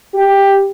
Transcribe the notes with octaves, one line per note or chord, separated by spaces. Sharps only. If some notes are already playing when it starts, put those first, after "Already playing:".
G4